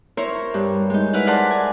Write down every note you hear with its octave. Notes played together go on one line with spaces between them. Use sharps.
E4 A#4 C5 C#5
G2
G#3 D#4
E4 B4 F5 F#5
G#4 A#4 C5 D5 F#5 A5
G#5